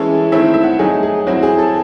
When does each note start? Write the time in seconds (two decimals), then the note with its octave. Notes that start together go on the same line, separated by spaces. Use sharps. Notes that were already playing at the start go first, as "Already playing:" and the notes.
Already playing: E3 G#3 C#4 E4 A4
0.32 D#3 A3 C4 E4 E5
0.54 E5
0.63 F#5
0.79 F#3 A3 D#4 G#4
1.03 G#4
1.27 F#3 C4 E4 F#4
1.43 G#4
1.58 A4